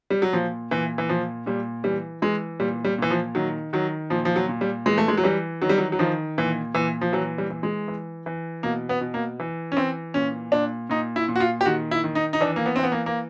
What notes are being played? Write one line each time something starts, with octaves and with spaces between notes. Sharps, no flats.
G3
F#3
A#2 F3
A#2 E3
E3
A#2 F3
A#2 G3
E3 G3
E3 G#3
A#2 G3
G3
A#2 E3
F3
D#3 F#3
D#3 F#3
A#2 F3
F3
F#3
A#2
G3
E3 G#3
A3
G#3
F#3
E3 G3
D#3 F#3
G3
F#3
F#3
D#3 F3
A#2 E3
A#2 E3
F3
E3 F#3
G3
E3
G#3
E3
E3
B2 A#3
B3
B2
A#3
E3
C#4
E3 C4
A#2 C#4
A#2 D4
A#2 D#4
E4
A#2
F#4
F4
G4
D#3 F#4
E4
D#3
D#4
D#4
E3 D4
A#3
B3
E3 C4
B3
A#3
A#3